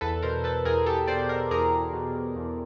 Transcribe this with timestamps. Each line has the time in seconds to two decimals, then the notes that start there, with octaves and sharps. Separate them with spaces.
0.01 E2 A4 B4
0.22 B2 A#4 C5
0.44 B2 A4 B4
0.65 E2 G#4 A#4
0.86 E2 G4 A4
1.07 B2 C5 D5
1.29 B2 A#4 C5
1.51 E2 G#4 A#4
1.72 E2
1.93 B2
2.15 B2
2.36 E2